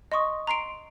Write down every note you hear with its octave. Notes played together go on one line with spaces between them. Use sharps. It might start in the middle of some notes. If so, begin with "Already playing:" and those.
D#5 C6 C#6 D#6
A#5 C6 C7 D7